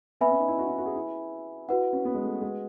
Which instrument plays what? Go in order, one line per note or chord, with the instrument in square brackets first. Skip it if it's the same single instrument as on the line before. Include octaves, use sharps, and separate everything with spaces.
[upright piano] B3 [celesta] B4 E5 G#5 B5
[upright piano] C#4
D#4
E4
F#4
E4
F#4
G#4
E4
[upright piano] E4 [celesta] F#4 B4 F#5
[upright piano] C#4
B3
G#3
A3
G#3